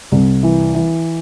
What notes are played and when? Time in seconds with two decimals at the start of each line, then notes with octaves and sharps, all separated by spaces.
0.12 C2
0.43 E3
0.75 E3